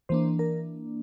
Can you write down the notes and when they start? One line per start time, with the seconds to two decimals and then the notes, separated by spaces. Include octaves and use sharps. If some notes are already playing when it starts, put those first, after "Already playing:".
0.09 E3 A#3 D4 C5
0.39 A#4